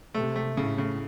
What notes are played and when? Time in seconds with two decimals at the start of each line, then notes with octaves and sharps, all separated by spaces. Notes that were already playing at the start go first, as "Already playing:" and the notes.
0.15 C3 A3
0.36 A3
0.57 A2 C#3
0.78 C#3